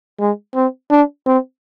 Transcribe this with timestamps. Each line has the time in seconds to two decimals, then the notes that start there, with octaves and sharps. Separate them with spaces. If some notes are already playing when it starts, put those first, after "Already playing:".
0.20 G#3
0.55 C4
0.91 D4
1.27 C4